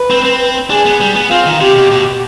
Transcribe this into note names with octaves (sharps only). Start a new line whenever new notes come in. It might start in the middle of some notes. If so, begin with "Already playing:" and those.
Already playing: B4
C4
C4
D4 G#4
B3
G3
B3
C4 F4
D#3
C3 G4
B2
B2